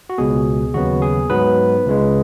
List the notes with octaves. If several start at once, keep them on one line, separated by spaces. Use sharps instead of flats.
F#4
C#2 B2 B3 G#4
D#2 C#3 F#3 B3 F#4
G#4
G#2 F#3 B3 B4
C#2 C#3 G#3